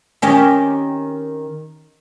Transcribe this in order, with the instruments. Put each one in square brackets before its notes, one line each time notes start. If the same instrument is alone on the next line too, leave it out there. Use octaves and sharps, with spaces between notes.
[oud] D#3 C#4 G4